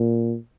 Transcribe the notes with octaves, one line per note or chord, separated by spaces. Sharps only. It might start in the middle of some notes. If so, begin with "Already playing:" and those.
Already playing: A#2